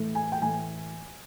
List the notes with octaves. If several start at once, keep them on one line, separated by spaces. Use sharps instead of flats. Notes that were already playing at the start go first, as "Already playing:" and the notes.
Already playing: A2 E3 A3
G#5
G5
A2 E3 A3 G#5